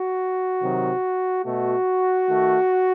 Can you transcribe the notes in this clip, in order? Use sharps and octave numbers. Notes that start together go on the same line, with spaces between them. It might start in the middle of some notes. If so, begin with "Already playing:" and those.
Already playing: F#4
C3 D#3 F#3
B2 A3 F#4
D#3 A3